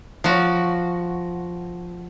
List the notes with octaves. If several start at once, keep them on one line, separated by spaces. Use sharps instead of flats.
F3 F#4